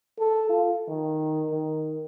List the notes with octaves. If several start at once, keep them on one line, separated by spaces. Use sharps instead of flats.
A4
F4
D#3
D#3